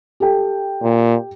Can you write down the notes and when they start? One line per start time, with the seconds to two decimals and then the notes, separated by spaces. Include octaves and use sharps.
0.20 G4 A4 G5
0.83 A#2